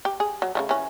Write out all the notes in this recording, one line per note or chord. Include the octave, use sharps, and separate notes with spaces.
G4
G#4
F#3
C#3 F#3 A3
E3 C#4